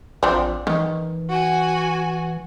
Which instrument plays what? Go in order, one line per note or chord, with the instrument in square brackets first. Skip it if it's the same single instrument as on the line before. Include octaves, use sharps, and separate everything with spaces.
[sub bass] A1 [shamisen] F3 C4 D4
[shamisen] D#3 [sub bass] E3
[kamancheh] F#4 G#5